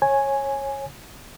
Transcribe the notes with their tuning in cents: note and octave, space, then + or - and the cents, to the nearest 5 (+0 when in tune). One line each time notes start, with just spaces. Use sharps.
C#5 -20 G#5 +0